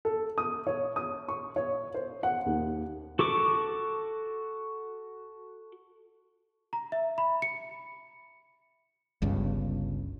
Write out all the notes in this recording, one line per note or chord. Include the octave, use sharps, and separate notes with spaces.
A4
D#6
C#5
D#6
C#6
C#5
C5
F#5
D#2
F#4 A4 C#6 D6
A#5
E5
B5
C#7
G1 C#2 G2 C#3